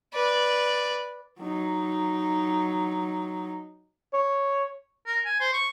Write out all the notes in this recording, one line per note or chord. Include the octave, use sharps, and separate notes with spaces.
B4 D5
F#3 D#4
C#5
A#4
G#5
C5
C#6